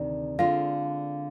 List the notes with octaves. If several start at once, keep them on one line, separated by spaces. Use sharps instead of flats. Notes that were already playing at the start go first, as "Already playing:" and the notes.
Already playing: D2 C3 D#3 D5
D3 G#3 C4 F4 F5